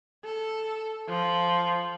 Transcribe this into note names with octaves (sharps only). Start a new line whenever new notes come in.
A4
F3